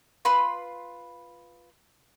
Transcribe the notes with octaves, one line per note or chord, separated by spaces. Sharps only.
F4 B4 B5 C6